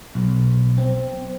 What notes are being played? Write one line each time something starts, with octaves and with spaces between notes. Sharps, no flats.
B1
C4